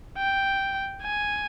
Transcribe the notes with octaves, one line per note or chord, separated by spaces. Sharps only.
G5
G#5